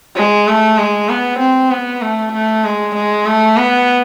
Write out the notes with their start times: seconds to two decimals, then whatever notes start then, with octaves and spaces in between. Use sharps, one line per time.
0.16 G#3
0.47 A3
0.78 G#3
1.09 B3
1.39 C4
1.70 B3
2.01 A3
2.33 A3
2.64 G#3
2.95 G#3
3.26 A3
3.57 B3